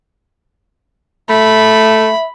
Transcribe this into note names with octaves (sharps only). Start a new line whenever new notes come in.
A3 E5 B5